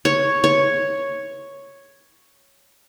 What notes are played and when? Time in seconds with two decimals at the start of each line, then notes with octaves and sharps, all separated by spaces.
0.05 C#5
0.44 C#5